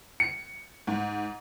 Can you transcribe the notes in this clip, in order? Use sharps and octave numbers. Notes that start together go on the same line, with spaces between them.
C#7
G#2